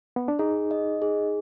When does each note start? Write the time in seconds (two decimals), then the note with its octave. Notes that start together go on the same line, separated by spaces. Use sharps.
0.16 B3
0.28 D4
0.39 D#4 G#4
0.71 D#5
1.02 G#4